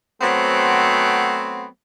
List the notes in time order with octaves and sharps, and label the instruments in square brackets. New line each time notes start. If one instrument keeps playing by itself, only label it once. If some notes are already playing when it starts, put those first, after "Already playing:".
[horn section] F#3 A3 B3 C4